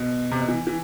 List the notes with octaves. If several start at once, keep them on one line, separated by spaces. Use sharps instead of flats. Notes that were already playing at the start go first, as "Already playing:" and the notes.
Already playing: B2
C3
B2
E3
E3